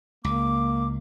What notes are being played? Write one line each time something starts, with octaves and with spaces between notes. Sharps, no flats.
C#2 A#3 D6